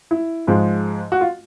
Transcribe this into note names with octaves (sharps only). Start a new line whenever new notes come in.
E4
G#2 F3 G#3
F#4
F4